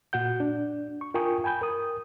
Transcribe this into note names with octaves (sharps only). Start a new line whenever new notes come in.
A#2 F#4 F#5 G6
D4
C#6
F4 A#4 G5 G#5 C#6 D#6
G5 G#5 B5 G6
A#4 D#6